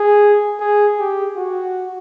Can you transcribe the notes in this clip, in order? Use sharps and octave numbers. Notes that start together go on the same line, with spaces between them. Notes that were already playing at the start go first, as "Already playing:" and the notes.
Already playing: G#4
G#4
G4
F#4